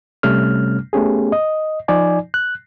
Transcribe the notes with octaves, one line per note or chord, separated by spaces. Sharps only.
C3 G3 A3 C#4 F6
A3 B3 C#4 G4 G#4
D#5
F3 D#4 D5 G#5
F#6